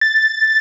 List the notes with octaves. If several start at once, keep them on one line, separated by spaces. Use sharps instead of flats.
A6